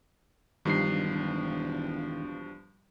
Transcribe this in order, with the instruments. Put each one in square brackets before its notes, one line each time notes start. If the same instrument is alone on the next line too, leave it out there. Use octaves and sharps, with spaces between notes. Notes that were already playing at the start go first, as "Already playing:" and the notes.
[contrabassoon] E1 [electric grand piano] G2 F3 G3 [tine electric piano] D#3 D#4 C7